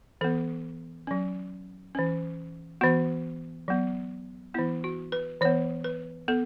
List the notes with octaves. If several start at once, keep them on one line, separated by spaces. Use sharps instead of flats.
E3 B3 A4
F#3 C#4
E3 C#4
E3 B3 F#4
F#3 B3
E3 B3 E4
F#4
B4
E3 B3 C#5
B4
B3 A4